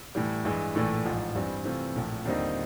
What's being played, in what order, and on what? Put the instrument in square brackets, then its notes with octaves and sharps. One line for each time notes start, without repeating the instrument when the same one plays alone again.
[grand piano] A2 E3 G3
G2 E3 G#3
A#1 A2 E3 A3
A1 G#2 F3
G2 E3 G3 C4
C3 E3 A3 C4 F4
A#1 A2 F3
D#2 D3 G3 C4 D#4